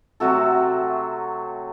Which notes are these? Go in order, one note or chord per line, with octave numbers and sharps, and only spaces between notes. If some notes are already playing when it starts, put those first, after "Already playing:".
C3 F#3 A3 F#4 A4